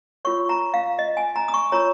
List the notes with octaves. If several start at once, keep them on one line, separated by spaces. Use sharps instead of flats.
F4 A#4 C#5 C#6
A#5
F5
D#5
G#5
A#5
D#6
C#6
F4 A#4 C#5 A#5